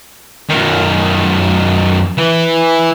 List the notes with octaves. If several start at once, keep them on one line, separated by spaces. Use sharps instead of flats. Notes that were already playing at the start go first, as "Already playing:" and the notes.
F#2 D#3
E3